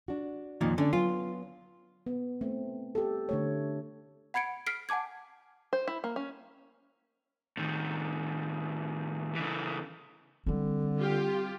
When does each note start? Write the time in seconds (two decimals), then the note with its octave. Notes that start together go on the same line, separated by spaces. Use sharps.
0.08 D4 F#4
0.61 F2 A#2 D#3
0.78 D3 C#4 D4 D5
0.93 F#3 B3 F4 G#5
2.06 B3
2.41 A3 C4
2.95 G4 A4
3.29 D3 A3 C#5
4.34 F#5 B5 G#6 C#7 D7
4.67 F6 B6 C7 D7
4.89 F#5 G#5 A5 D6 G#6
5.73 C5
5.87 E4
6.04 A#3
6.16 C#4
7.57 A2 D#3
9.35 C#3 E3
10.46 D3 G3 C4
11.00 F4 G4